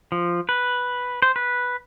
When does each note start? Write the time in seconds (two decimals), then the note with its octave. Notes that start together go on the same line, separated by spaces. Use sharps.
0.12 F3
0.49 B4
1.22 C5
1.36 B4